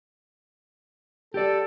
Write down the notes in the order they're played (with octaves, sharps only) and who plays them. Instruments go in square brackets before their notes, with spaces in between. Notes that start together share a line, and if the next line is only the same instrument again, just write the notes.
[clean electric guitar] G4 D5 [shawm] A4